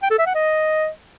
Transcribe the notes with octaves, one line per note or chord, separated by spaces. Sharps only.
G5
A4
E5
F#5
D#5